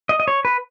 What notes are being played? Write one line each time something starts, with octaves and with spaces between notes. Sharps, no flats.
D#5
D#5
C#5
B4